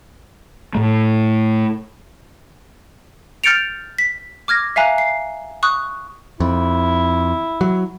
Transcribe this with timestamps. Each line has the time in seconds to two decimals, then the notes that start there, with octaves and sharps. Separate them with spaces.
0.75 A2 A3
3.44 F6 G6 A6 C#7 D7 F7
3.98 B6
4.48 D6 F6 G#6 A#6
4.76 E5 F5 G#5 A#5 F#6
4.98 C7
5.63 C#6 D#6 F#6
6.40 F2 E4
7.61 F#3